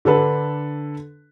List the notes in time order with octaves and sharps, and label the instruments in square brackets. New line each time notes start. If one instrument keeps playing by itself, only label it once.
[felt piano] D3 D4 A4 B4